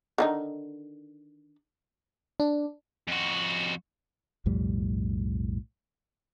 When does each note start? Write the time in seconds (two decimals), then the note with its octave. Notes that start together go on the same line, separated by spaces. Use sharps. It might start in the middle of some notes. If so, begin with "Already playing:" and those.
0.18 D3 D#3 D#4
2.40 D4
3.08 F2 F#4
4.46 B1 F2 A2 G3